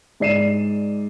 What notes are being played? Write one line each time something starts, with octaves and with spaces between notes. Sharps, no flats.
G#2 D5 C7 D#7 E7